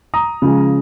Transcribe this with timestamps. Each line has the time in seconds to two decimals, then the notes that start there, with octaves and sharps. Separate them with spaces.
0.14 A#5 D#6
0.42 C#3 F3 G#3